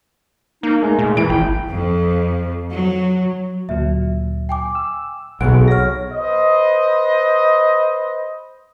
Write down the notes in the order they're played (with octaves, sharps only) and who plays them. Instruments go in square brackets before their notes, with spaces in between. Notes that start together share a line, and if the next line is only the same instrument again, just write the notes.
[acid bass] A#3 [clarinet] D#4
[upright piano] G#3 [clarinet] A3
[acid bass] A#2
[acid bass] E3 [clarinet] E4 [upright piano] D7
[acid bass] G#1 [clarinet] G5
[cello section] F2
F#3
[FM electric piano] D2 A#2 F#3 [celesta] E5
[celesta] G5 G#5 D6
[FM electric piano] E6
[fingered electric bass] B1 B2 [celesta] G#4 D7 [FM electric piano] F#5
[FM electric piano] C#5 A#6 [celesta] F#5 F6
[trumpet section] B4 C5 D#5